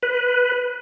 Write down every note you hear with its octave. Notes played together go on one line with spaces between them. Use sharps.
B4